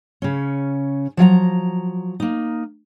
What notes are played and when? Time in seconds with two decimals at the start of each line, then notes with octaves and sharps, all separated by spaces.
0.22 C#3 C#4
1.17 F3 F#3 F5 A#5
2.20 A#3 D#4